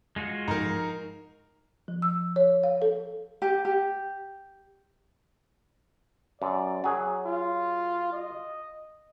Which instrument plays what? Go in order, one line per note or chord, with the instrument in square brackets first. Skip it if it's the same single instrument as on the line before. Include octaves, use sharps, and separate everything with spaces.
[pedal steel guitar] G#3 F4 F#4
[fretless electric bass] G#2 F3 [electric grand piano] D#4 A#4 [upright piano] A#5
[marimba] F3
E6
C#5
F5
A4
[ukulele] G4
G4
[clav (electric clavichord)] F#2 [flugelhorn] D5
[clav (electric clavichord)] F#3 G#4
[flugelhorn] F4
D#5